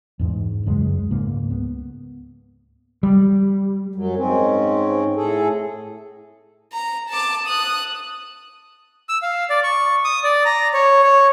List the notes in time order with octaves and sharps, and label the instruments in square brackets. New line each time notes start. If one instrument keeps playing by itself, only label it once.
[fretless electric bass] E2 G#2
C#2 F#2 G#3
C#2 G#2 A#3
B3
G3
[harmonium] F#2 F#3
G#2 C4 C#4
A2 G#4 A4
[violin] A#5
A5 D6
D#6 F#6
[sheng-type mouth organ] E6
F5
D5
C#6
D#6
D5
A#5
C#5
C#5